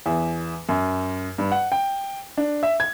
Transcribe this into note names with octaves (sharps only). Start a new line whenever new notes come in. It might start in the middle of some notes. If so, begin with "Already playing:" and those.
E2
F#2
G2
F#5
G5
D4
E5
G#6